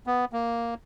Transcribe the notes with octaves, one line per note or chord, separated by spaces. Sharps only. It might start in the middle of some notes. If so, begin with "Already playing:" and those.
B3
A#3